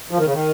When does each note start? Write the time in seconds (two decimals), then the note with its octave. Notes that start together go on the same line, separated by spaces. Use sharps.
0.11 F3
0.19 D#3
0.26 C#3
0.33 D#3